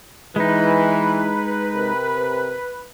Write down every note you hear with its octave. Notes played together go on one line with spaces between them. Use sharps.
E3 G#3 D#4 B4
C3 A#4